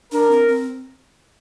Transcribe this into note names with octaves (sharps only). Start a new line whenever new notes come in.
D4 A#4
C4
C4